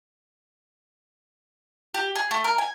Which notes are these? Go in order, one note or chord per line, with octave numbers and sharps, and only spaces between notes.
G4
G#4
A3
A#4
G#5